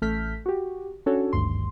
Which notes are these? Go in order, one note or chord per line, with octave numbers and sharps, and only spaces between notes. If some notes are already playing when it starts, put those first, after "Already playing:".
A1 A3 A4 F6 G6 B6
F#4 G4
C#4 D4 F#4 A4 C#5
G#1 D2 G2 C6